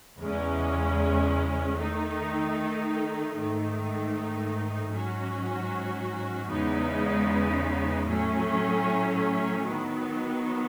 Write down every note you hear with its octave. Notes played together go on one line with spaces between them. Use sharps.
E2 C#3 G#3 C#4
D#3 A3 D#4
G#2 D#3 A3 D#4
G#2 F#3 C#4 F#4
E2 C#3 G#3 B3 D#4
A2 F#3 A3 C#4
D#3 F#3 B3